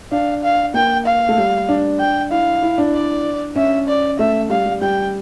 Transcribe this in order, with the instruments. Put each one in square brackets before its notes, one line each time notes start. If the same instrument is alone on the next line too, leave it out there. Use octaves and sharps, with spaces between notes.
[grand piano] D4 [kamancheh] F5
[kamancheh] F5
[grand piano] A#3 [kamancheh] G5
[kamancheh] F5
[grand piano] A3
G3
D4
[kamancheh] G5
[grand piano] E4 [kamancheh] F5
[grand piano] E4
D4
[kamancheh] D5
[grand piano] C#4 [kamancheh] E5
[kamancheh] D5
[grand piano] A3 [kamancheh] E5
[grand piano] G3 [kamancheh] F5
[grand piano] G3
[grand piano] G3 [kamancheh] G5